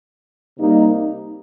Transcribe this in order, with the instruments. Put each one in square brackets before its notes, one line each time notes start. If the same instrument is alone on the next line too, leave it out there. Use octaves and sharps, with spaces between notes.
[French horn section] C3 G3 A#3 D#4